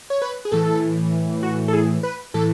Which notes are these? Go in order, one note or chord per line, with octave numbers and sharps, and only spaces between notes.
C#5
B4
G#4
A2 E3 A4
F#4
A4
G#4
B4
A2 E3 A4